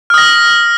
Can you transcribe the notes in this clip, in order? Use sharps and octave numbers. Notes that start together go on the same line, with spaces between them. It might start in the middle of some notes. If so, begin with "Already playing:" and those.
D#6 F6 A#6